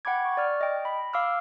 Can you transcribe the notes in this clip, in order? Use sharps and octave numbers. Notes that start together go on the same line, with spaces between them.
F#5 G5 B5 D6 G#6
C#6
D5 F6
D#5 G5
B5
F5 D6 E6 F6